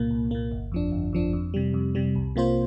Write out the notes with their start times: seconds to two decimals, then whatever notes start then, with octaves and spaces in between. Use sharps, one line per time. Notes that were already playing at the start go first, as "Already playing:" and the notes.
Already playing: C2 A#2 A#3
0.10 C2
0.31 A#2 A#3
0.52 G1
0.72 F2 F3 D4
0.92 G1
1.13 F2 F3 D4
1.33 F2
1.54 C3 G3
1.74 F2
1.95 C3 G3
2.15 C2
2.36 C3 A#3 F4 C5